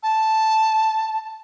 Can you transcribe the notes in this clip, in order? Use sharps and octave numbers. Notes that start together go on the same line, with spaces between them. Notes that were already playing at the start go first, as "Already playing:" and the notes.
A5